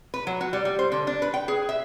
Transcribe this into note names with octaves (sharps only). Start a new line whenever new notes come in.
B4
F#3
F#4
G3
G3
C5
D3
D4
B4
G5
G#4
E5